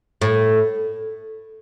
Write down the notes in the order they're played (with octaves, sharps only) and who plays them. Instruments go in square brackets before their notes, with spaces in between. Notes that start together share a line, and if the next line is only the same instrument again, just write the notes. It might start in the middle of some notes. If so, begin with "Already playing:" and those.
[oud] A2